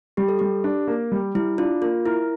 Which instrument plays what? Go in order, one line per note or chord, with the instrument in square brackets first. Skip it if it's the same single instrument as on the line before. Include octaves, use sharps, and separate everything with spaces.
[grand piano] G3 [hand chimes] G4
[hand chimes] A4
[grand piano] G3 [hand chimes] G4
[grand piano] D4
A#3
G3
[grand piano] G3 [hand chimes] E4
[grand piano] D4 [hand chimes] F4
[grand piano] A#3 [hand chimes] F4
[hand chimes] E4 [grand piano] A#4